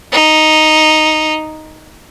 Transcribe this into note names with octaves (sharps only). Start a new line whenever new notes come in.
D#4